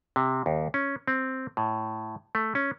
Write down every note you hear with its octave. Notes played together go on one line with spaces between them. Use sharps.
C3
D#2
C#4
C4
A2
A3
C#4